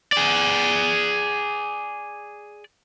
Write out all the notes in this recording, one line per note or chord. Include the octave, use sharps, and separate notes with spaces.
G#4 D5